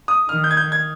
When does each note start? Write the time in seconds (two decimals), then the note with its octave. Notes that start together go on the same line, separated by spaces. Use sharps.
0.08 D#6
0.29 D#3 F6
0.44 G6
0.51 G#6
0.57 G6
0.72 G#6